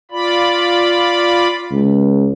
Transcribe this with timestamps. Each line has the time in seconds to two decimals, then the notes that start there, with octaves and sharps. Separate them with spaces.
0.11 F4 D5 B5
1.71 C#2